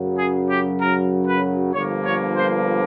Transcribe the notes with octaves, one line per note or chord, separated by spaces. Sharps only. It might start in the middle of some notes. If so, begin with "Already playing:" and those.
Already playing: F#2 C#3 F#3
G#4
G4
A#4
B4
G1 G2 D3 F3 A#3 C#5
C#5
C5